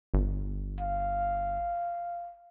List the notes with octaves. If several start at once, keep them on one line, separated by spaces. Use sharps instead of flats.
G1
F5